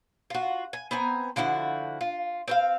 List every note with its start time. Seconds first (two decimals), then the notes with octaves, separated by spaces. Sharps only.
0.30 F4 F#4
0.73 G#5
0.91 B3 C4 G#5 A#5
1.36 D3 F3 E4 F#4
2.01 F4
2.48 C4 C5 F5